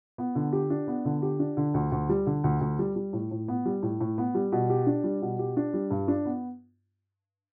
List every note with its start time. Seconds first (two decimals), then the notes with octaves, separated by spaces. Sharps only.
0.18 B3
0.35 D3
0.53 G4
0.70 D4
0.88 B3
1.05 D3
1.22 G4
1.39 D4
1.57 D3
1.74 D2
1.92 D2
2.09 G3
2.26 D3
2.44 D2
2.61 D2
2.79 G3
2.96 G3
3.13 A2
3.31 A2
3.48 B3
3.66 G3
3.83 A2
4.00 A2
4.18 B3
4.35 G3
4.52 B2
4.70 G4
4.87 D4
5.04 G3
5.22 B2
5.39 G4
5.57 D4
5.74 G3
5.91 G2
6.08 D4
6.25 B3